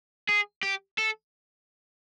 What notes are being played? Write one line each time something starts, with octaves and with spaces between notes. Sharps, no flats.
G#4
G4
A4